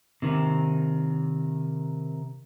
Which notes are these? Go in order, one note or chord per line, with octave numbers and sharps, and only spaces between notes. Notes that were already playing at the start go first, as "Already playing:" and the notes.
C3 D#3